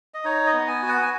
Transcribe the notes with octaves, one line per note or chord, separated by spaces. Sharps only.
D#5
D#4 C#5
D#5
B3
G#5
F#4
F#5
G#5